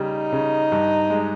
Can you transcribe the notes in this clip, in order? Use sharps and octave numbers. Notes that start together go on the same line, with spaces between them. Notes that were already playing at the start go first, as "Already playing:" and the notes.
Already playing: C#3 G3 D#4
C#3
G2
G#3